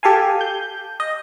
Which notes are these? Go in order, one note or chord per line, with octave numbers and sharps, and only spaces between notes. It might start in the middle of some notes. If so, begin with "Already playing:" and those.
G4 A4 F5 G#5
G6
D#5